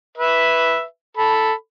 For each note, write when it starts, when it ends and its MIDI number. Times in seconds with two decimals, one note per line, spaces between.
0.18 0.83 71
0.18 0.83 76
1.17 1.53 69
1.17 1.53 83